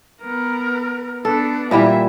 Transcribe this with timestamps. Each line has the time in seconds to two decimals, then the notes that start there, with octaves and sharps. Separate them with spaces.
0.22 B3 A#4
1.25 B3 D4 A4
1.71 A#2 E3 G3 E5